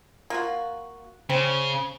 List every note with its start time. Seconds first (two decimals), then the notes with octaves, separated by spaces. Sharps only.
0.30 A#3 F4 F#4
1.30 C#3 C4